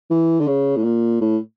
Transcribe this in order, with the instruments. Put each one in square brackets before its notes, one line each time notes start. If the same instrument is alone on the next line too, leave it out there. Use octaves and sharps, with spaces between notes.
[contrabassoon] E3
D3
C#3
A2
A#2
A2